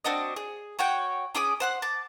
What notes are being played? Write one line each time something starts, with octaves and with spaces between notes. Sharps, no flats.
C4 D4 F#4 D#5
G#4
F#4 C#5 F#5 G5
C#4 G#4 D6 D#6
C5 F#5 F#6
A5 D6